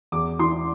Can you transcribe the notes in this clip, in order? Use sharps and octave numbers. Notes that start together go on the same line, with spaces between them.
E2 D6
E3 C6